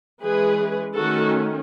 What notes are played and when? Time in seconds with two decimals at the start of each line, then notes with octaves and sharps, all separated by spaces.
0.22 E3 G#3 C#4 G#4 B4
0.96 D#3 A3 C#4 F#4 A4